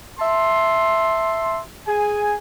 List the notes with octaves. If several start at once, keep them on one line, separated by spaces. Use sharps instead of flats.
E5 A5 C6
G#4 G#5